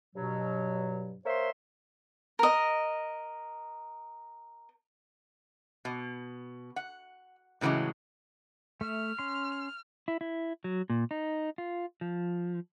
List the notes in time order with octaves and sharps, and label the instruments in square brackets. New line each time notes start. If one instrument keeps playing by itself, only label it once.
[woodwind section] G2 B2 F#3
A#3 A#4 C5 C#5 E5 C6
[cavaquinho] A#4 D#5
[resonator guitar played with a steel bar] B2
F#5
A2 C#3 E3 F#3 G#3
[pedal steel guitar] A3 E5 [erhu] F6
[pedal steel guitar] C#4 C6
[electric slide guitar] E4
E4
F#3
A#2
D#4
F4
F3